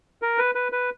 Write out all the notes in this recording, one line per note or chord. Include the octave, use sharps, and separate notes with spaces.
A#4
B4
B4
B4